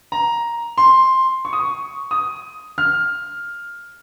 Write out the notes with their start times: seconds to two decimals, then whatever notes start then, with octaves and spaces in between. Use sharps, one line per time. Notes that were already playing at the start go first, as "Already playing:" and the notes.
0.12 A#5
0.78 C6
1.45 C#6
1.53 D#6
1.60 C#6
2.11 D#6
2.78 F6